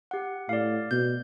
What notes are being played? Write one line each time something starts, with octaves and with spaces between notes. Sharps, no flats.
G4 F#5
A2 D5 F5
B2 G6